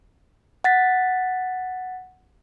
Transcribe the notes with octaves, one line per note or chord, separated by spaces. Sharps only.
F#5 A6 B6